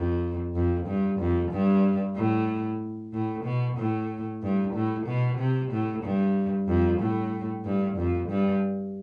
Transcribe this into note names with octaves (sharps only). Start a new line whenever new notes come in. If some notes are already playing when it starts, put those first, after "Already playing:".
Already playing: F2
F2
G2
F2
G2
A2
A2
B2
A2
G2
A2
B2
C3
A2
G2
F2
A2
G2
F2
G2